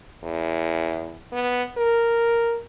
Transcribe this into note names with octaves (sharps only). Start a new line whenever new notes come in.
E2
B3
A#4